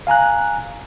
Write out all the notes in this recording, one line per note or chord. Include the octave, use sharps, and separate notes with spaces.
F5 G#5 A#5 F#6